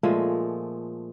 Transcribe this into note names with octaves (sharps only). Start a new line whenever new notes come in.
A#2 F3 G#3 A3